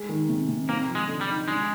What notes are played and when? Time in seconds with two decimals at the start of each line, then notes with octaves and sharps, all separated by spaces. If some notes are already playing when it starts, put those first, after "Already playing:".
Already playing: G#3
0.09 D#3
0.29 C3
0.49 C3
0.69 A#3 C4
0.88 F3
0.95 G#3
1.08 D3
1.21 G3
1.28 D#4
1.48 G#3 D4